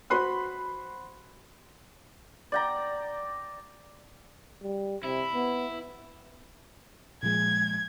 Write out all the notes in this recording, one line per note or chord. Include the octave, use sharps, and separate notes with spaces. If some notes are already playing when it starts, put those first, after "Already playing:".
F#4 C5 B5 C6 F#6
D5 G5 A#5
G3
C3 E4
B3
A#2 F3 G#3 G#6